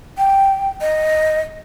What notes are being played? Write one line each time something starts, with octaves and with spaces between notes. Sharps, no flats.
G5
D#5